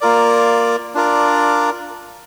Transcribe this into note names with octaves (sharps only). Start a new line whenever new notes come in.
A#3 F4 A#4 D5
D4 F4 A#4 D5